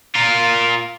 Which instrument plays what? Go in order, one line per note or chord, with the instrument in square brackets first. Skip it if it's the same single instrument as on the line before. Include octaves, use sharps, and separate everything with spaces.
[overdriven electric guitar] F4 A#4